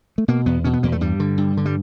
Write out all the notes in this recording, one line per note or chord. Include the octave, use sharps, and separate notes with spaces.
A3
B2 A#3
E2 B3
B2 C#4
B3
E2 A#3
A3
G2 G3
D3
G2
D3
G3